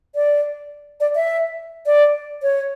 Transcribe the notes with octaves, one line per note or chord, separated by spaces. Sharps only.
D5
D5
E5
D5
C#5